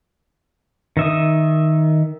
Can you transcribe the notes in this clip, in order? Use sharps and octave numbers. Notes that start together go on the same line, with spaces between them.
D#3 E5 D#6